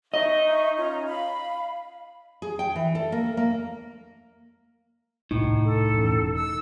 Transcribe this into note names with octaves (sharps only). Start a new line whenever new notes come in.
D#4 D#5 E5 C#6
C#4 F4 A#5
F5 B5
G#4
G5
E3
A4
A#3
A#3
D#1 C2 A2 D#4
A4
E1 E3 C#4
E6